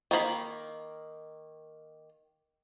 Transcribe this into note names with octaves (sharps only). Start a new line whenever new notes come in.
D#3 A#3 F4 B5